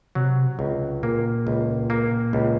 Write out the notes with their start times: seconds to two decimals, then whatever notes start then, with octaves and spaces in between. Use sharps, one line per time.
0.15 C3 F#3
0.59 C#2
1.03 A#2 A#3
1.47 C#2
1.90 A#3
2.33 C#2